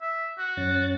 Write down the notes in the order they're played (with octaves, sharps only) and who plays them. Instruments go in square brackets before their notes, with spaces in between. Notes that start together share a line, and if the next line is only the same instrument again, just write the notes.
[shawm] E5
F#4
[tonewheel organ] F#2 C#4 A6